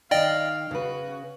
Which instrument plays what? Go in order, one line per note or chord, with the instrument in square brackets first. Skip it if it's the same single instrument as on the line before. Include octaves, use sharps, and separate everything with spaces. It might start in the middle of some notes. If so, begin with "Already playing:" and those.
[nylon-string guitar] D#3 D#4 [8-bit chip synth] D5 D#5 G5 [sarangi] F5
[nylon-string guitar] C#3 B4 [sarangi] F#4